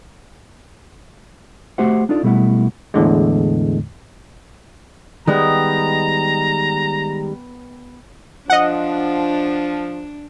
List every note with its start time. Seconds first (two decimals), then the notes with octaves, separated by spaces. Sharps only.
1.78 A3 F#4 G4 C5 E5 F#5
2.09 D4 D#4 F4 A4 D5
2.23 B1 B2 G3 A3 E4 F#5
2.94 E2 A2 D3 G#3
5.27 D#3 G3 G#3 B3 G5 A#5
8.50 F3 D4 D#5 F#5